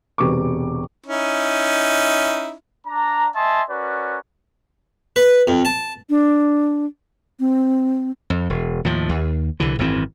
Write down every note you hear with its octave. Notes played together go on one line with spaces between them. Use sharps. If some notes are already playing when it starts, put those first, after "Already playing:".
E1 C3 B3 C#6 D6
C#4 D#4 E4
D4 A#5
D#5 E5 G#5 A5 C6
C#4 F#4 A#4 B4 D5
B4
F2
A5
D4
C4
F2
E1
D#2 A2 F3
D#2
C2 D3 E3
G#1 F#2 E3 C4